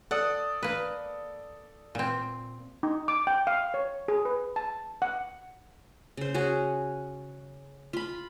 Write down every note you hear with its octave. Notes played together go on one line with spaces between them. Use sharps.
A4 D5 F#5 D#6
A#3 B4
A#2 C4
D#4
D6
G5
F5
C#5
G#4
B4
A5
F#5
C#3 C5
C#4 F#4 G#4
F4 B5